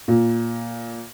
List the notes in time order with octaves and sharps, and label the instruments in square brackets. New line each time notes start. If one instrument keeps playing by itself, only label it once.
[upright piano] A#2